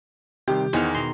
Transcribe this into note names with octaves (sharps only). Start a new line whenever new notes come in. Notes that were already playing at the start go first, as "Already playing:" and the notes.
C3 D#3 G3 G4
E2 D#3 G#4 C5 F#5 F6
B2 A#5 C6